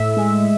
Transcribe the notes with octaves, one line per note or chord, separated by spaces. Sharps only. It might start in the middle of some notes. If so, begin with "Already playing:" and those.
Already playing: A2 E5
G#3